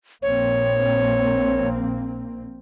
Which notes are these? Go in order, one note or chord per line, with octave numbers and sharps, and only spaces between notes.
A#1 A#3 C4 C#5